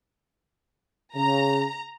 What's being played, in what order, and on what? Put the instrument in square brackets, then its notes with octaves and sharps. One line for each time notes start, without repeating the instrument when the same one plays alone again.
[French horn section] C#3 [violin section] A#5